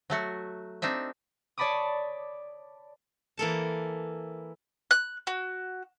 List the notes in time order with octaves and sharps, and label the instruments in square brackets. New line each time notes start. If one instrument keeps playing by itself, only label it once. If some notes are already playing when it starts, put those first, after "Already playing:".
[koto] F#3 A3 F#4
C4 D4 D#4 E5
[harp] C#5 D5 A5 B5 D6 D#6
[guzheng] E3 A#3 A4 A5
[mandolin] F#6
F#4